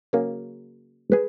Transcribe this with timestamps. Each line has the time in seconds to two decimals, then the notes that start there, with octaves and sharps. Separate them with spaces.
0.13 C#3 F#3 A#3 C#4 G#4
1.12 G#4 B4